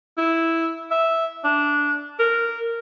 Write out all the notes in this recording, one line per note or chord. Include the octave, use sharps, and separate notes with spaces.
E4
E5
D4
A#4